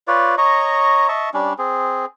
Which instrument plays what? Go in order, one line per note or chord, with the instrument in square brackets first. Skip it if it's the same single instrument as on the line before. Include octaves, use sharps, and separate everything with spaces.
[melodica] F4 B4 C#5 D5
C#5 D#5 A#5 C#6
D#5 E5 A5 C#6
G3 C#4 D4
C4 G#4